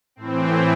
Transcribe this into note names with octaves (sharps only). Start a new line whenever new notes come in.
A2 E3 C4